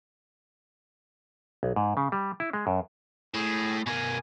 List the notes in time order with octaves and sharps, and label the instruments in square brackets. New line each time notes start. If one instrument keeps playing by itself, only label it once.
[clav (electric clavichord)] B1
G#2
C#3
G3
E4
G#3
F#2
[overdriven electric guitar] A2 [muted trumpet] G#4
[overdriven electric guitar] B2 A#4 [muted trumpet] G#5